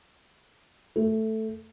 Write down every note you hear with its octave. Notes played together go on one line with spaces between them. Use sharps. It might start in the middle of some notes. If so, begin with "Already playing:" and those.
A3